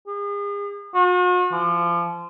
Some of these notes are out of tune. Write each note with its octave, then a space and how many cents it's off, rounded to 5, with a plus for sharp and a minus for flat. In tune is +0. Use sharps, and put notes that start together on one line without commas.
G#4 -40
F#4 -45
F3 -25